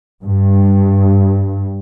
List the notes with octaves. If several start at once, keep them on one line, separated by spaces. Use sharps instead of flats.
G2